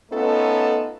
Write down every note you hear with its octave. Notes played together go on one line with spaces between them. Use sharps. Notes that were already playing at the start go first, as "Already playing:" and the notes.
A3 B3 C#4 D#4 F4 A4